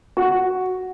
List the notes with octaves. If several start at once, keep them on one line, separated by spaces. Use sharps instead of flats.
F#4